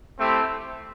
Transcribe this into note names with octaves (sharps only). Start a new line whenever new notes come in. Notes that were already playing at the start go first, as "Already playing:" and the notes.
A3 C4 E4 G4 C5